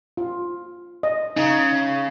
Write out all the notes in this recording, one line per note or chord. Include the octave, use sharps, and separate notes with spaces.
F4
D#5
C#3 D#4